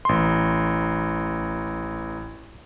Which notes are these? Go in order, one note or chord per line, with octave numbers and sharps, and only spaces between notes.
A1 C6